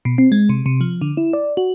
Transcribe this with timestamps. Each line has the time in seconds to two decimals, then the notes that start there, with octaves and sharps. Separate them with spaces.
0.05 B2
0.18 C4
0.32 G#3
0.49 C3
0.66 C3
0.81 F3
1.02 D3
1.17 E4
1.33 D5
1.57 F#4